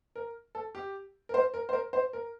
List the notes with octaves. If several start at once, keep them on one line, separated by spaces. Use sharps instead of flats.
A#4
A4
G4
A#4
C5
A#4
C5
A#4
C5
A#4